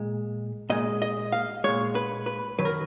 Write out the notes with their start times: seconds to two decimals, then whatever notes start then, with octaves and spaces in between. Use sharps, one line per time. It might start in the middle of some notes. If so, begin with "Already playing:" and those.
Already playing: A#2 G#3
0.70 A#2 G#3 D#5
1.02 D#5
1.32 F5
1.64 A#2 G#3 C#5
1.95 B4
2.26 B4
2.58 F#2 D#3 F#3 B4
2.65 A#4